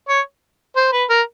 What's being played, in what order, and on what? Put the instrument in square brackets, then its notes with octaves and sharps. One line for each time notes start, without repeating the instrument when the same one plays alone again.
[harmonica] C#5
C5
B4
A#4